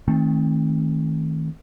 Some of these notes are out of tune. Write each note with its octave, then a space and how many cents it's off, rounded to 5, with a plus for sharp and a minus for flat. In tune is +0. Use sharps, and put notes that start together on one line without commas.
D#3 +25 A3 +0 C4 +35